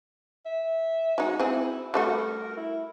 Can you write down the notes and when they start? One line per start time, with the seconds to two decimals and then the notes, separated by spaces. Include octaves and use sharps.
0.45 E5
1.18 G#3 D#4 F#4
1.40 C4 E4 G#4
1.94 G3 A3 F#4 A#4
2.57 E4